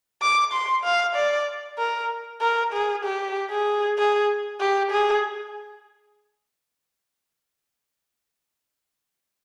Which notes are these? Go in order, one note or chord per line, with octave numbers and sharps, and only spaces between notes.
D6
C6
F5
D5
A#4
A#4
G#4
G4
G#4
G#4
G4
G#4